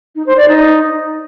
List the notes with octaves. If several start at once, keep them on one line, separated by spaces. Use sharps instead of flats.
D#4
C5
D5
D#4